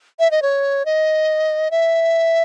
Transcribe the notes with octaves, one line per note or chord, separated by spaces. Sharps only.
E5
D#5
C#5
D#5
E5